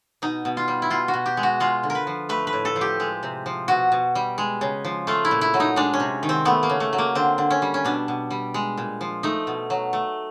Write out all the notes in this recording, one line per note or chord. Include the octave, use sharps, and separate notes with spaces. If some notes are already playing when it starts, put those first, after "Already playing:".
B2 D#4
B2
F4
G3
E4
B2 F4
F#4
B2
G4
G#3
F#4
G#3 F4
D3
A#4
B4
F3
A3 B4
B4
A2
A4
F3
G4
G#3
C3
F3
B2 F#4
B2
G3
G#3
C#3
F3
A3 F4
E4
A#2
E4
F#3
D#4
G#3 D4
C#4
C3
D#3
C4
A3 B3
A#3
C#3
A3
F#3
A#3
D3 C4
D3
C#4
G3
C#4
B2 D4
B2
G3
G#3
A#2
F3
A3 D#4
B2
F#3
A3